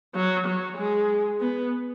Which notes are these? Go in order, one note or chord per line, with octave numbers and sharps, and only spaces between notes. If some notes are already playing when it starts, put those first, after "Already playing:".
F#3
F#3
G#3
B3